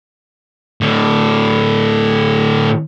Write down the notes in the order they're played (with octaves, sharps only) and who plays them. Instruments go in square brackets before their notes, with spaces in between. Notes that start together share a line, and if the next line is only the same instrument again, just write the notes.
[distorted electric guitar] A2 D3